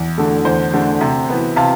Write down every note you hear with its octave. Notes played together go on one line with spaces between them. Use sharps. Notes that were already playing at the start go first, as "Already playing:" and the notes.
Already playing: E2
D3 A3
E2 C5
D3 A3
C3
E3 B3
C3 F5 A5